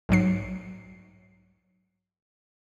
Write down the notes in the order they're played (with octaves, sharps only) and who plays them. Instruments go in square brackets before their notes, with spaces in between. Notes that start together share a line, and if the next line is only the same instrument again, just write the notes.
[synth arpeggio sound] B1 G#2 F#3 C7